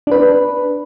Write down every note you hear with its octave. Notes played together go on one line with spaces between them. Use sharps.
D4 B4